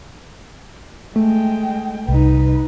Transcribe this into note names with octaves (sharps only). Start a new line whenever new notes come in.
G#3 A3 G5
C2 D#4 B4